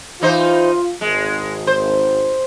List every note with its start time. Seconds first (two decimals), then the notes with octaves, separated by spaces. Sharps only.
0.21 E3 D#4 F4 C5
1.01 G#1 G#3
1.67 C5